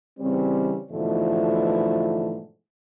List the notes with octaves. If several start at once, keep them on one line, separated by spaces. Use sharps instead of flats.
C#3 E3 G3 C4
G#2 B2 D3 E3 F3 A3